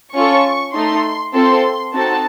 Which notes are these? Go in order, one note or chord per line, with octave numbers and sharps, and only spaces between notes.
C#4 F4 A4 C#6
A3 D#4 A4 C6
C4 F4 A4 C6
C4 D#4 F#4 A4 A5